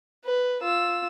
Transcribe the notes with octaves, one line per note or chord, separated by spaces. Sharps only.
B4
F4 E6